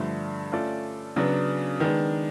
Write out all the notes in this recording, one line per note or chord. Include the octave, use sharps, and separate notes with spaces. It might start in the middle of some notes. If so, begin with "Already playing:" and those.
Already playing: G2 D3 F3 A3
A3 C#4 F4 A4 D5
C#3 F#3 B3 D4
D#3 G#3 B3 D4